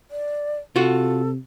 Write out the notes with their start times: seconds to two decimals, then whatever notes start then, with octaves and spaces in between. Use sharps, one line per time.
0.11 D5
0.76 C3 F4 F#4 A4